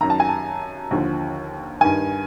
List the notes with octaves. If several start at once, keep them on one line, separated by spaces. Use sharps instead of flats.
F#2 D#3 A#5
A5
G#5
A5
D#2 D3 F3
G2 D#3 G#5